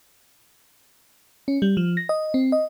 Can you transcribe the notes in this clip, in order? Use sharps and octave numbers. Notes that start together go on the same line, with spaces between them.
C#4
G3
F3
A#6
D#5
C4
D#5